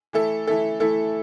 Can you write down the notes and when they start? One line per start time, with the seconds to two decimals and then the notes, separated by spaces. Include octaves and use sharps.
0.13 E3 A3 E4 A4
0.47 E3 A3 E4 A4
0.80 E3 A3 E4 A4